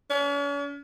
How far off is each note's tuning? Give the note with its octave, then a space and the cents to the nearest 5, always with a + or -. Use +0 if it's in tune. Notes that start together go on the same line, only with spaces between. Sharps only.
C#4 +40